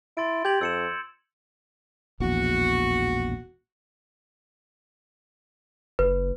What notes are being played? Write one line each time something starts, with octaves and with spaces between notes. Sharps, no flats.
E4 C6 A6 D7
G4 G6 G#6 F#7
F2 E6 C#7 E7
E1 A#1 E2 F#4
F#1 B4